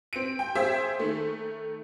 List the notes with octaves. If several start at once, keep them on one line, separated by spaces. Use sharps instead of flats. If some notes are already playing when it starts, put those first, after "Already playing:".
C4 D7
G5
G#4 C5 E5
D#3 A3